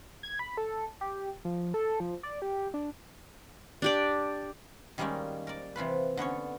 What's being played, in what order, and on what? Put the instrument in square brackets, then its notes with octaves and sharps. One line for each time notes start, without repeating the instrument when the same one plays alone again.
[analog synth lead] G#6
B5
A4
G4
F3
A4
F3
D5
G4
D4
[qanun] D4 G4 D5
[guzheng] D#3 G3 G#3 A#3 C#4 D#4
A#4 D5
C3 E3 F4 B4
D3 B3 C#4 C#5